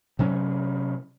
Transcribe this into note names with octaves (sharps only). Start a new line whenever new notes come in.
C3 F#3 C#4